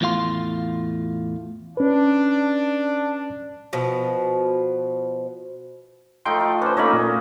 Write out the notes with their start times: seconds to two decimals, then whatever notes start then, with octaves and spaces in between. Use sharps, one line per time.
0.01 E2 A2 F4 F5 C6
1.77 C#4 D4 B4
3.73 B2 F3
6.25 F3 A3 D#4 D#5 G5 C6
6.40 F4
6.62 C#4 D4 B4 C5
6.77 A3 A#3 C#4 D#4 F#4 C#5 D#5 B5
6.93 A#2